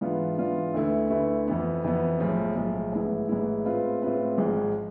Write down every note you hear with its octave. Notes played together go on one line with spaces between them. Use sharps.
G#2 E3 B3 D4 F4
G#2 E3 B3 D4 F4
D2 D3 A3 E4 B4
D2 D3 A3 E4 B4
F2 E3 B3
F2 E3 B3
B1 A2 F3 G#3
B1 A2 F3 G#3
A1 G#2 G#3 B3 E4
A1 G#2 G#3 B3 E4
A2 G#3 C4 F4 B4
A2 G#3 C4 F4 B4
G#1 G#2 F3 G#3